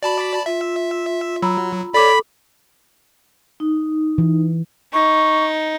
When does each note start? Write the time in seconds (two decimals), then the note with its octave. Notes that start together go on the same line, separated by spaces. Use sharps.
0.03 F#4 D5 A5 B5
0.46 F4 E5
1.42 F#3 A#5 B5 E6
1.94 A4 C#5 D5 B5 D6
3.60 D#4
4.18 E3
4.94 D#4 C#6